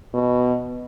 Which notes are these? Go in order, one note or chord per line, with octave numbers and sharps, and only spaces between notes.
B2